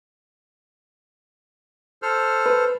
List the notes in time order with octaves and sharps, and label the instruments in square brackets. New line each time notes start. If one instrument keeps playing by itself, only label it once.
[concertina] A4 C5 F6
[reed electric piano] B4